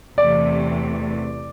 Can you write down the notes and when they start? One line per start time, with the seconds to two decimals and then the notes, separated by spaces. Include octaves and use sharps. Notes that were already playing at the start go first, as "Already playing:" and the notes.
0.18 E2 C3 E3 A3 D5